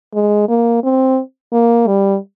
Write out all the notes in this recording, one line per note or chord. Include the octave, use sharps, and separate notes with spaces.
G#3
A#3
C4
A#3
G3